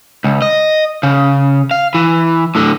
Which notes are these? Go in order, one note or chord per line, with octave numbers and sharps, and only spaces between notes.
C#2
D#5
C#3
F5
E3
A2 D3